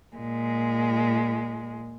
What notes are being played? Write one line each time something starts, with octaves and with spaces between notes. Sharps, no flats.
A#2 G#3